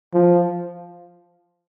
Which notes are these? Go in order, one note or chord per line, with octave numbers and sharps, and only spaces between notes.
F3